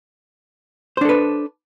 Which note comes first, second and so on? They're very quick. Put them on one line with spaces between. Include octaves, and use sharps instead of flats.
C5 D4 A4 B4